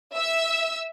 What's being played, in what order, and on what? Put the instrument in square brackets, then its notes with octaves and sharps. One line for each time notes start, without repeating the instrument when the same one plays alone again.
[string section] E5 E6